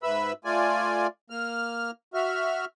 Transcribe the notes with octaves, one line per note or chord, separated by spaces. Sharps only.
G#2 B4 E5 B5 E6
A3 F4 D5 G#5
A#3 F6
F#4 E5 F6